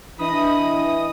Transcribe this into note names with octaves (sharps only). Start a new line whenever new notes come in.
E3 D4 D#5 B5 D#6